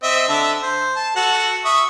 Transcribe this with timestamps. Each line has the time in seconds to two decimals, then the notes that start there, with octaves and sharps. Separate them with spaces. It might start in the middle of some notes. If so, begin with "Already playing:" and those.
0.03 C4 D#5 E5
0.29 D3 A4 E5
0.63 C5
0.96 A5
1.16 F#4 A4 F#5
1.65 E5 C#6 D#6